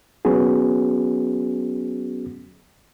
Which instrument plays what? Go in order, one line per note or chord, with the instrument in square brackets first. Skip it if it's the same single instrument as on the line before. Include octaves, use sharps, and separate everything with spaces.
[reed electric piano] F#3 B3 C#4 F#4 G#4